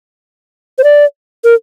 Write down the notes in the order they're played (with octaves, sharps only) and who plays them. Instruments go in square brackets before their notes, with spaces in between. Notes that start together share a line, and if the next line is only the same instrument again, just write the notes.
[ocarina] C5
D5
A#4